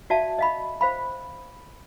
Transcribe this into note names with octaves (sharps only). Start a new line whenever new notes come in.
F#4 D5 E5 F5 A5
D#5 F5 B5
C5 F5 B5